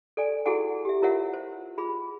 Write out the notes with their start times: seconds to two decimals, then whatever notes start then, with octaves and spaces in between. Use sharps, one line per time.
0.17 A4 D5 G#5
0.46 E4 F#4 G#4 A4 F#5 G#5
0.85 G4 E5
1.02 E4 F4 A#4 C#5 E5 F#5
1.33 C5
1.78 F4 G#4 B5